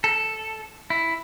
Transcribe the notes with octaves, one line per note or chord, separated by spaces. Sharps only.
A4
E4